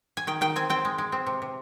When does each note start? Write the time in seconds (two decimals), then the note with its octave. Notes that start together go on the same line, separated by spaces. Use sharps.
0.17 G#5
0.27 D#3 G5
0.41 D#3 G5
0.56 C4 G#5
0.70 C4 G5
0.85 G#3
0.98 G#3
1.12 C4
1.26 C3
1.42 C3